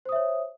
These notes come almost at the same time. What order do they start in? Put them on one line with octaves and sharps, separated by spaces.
C5 D#6 E5 C#5